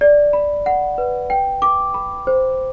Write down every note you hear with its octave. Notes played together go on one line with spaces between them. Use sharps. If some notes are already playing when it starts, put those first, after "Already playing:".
D5
B5
F#5
B4
G5
D6
B5
C5